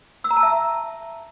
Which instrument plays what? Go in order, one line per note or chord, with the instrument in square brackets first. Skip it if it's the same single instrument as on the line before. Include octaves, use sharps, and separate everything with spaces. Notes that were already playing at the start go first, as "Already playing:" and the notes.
[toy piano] E6
A#5
A5
E5